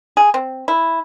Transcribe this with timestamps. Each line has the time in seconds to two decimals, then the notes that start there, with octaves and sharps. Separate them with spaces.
0.17 G#4
0.34 C4
0.68 E4